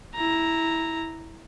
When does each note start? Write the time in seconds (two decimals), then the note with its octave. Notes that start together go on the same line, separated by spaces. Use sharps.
0.15 E4 A#5